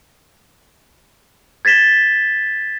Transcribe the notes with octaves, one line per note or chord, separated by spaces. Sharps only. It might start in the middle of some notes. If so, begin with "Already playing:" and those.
G#6 A6 B6 E7 G7